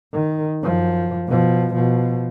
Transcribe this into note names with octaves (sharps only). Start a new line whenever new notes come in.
D#3
F#2 F3
B2 F3
B2 F3